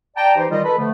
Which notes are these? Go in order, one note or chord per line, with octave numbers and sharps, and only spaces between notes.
D5 G5 A5 A#5
E3 D#4 G4 C5
D#3 G3 F4 D#5
A4 B4 B5
D3 F3 A3